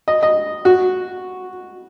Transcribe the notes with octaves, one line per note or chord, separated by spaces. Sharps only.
D#5
D#5
F#4